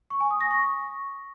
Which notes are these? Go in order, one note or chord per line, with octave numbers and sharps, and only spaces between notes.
C#6
G#5
D#6
A#6
C#6